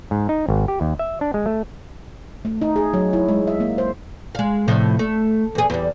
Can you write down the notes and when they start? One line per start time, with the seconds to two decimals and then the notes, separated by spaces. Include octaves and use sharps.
0.11 G#2
0.29 D#4
0.48 G#1
0.68 G4
0.81 D#2
0.99 E5
1.21 D4
1.34 G#3
1.46 A3
2.45 A3
2.61 D#4
2.76 G#4
2.94 F#3
3.13 E4
3.29 G#3
3.47 E5
3.60 A#3
3.78 C5
4.35 G#3 F5
4.68 A2 C3 F3
4.99 A3
5.55 E2 G#4
5.70 E2 G3